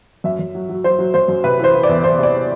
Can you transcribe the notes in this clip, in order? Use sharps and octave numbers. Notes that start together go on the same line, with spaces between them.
F#2 E5
F#2
F#3
F#3
F#3 C5
F#3
F#2 C5
F#2
C3 B4
E3 C5
E3
D5
E2
E2 C5
C3 D5